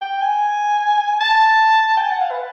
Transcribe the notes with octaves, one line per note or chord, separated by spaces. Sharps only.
G5
G#5
A5
G5
G#5
F#5
F5
B4